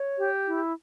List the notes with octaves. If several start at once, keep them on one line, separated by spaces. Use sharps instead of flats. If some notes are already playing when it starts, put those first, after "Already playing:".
Already playing: C#5
G4
E4